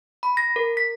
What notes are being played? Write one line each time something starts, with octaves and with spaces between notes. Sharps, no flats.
B5
A#6
A#4
B6